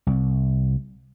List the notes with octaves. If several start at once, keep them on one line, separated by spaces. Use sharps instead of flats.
C2